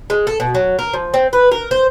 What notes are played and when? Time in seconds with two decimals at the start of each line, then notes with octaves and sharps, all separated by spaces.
0.10 G#3
0.27 A4
0.40 B2
0.55 F#3
0.79 A#4
0.93 F3
1.14 C4
1.33 B4
1.51 A#4
1.71 C5